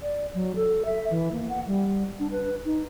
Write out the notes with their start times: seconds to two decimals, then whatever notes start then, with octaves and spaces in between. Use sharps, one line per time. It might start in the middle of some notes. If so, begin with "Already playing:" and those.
0.02 D5
0.34 F#3
0.56 A4
0.85 E5
1.10 E3
1.33 A#3
1.49 F#5
1.67 G3
2.20 D4
2.31 B4
2.65 D#4